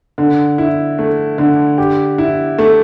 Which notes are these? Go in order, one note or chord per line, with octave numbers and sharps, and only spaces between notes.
D3
E4
A3
D3
G4
E4
A3